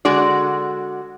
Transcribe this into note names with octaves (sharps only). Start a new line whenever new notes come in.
D3 G#3 F#4 D5